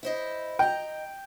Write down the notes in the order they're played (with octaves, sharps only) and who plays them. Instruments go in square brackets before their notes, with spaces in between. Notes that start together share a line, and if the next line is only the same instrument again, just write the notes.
[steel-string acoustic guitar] E4 C5 D#5
[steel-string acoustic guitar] D#5 A#5 [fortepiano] G5